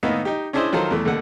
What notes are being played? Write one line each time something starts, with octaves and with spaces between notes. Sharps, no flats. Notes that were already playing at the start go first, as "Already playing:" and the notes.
A2 D#3 A#3 B3 D#4 E4
D#4 G4
C#4 D4 E4 G#4 C5 D#5
D#3 F#3 F4 A4 A#4 C5
E2 A3
D#2 D3 A3 F#5